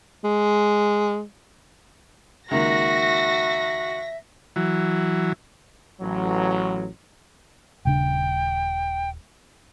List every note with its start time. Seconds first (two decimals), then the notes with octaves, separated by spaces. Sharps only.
0.24 G#3
2.51 C#2 D#3 A#3 F#4 E5 A#6
4.56 E3 F#3
6.01 A1 F#3
7.85 D#1 C#3 D4 G5